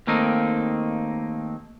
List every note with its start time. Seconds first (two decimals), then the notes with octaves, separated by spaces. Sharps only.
0.07 D#2 A3 A#3 C4 D#4